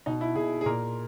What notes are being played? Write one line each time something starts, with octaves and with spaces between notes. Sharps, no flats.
B2 D#4
E4
B2 G#4
G#4
A#2 A#4